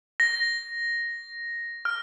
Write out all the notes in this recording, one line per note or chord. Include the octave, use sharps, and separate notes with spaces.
A#6
F6